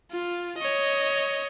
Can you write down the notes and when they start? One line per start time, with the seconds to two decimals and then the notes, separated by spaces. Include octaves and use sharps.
0.11 F4
0.58 C#5 D#5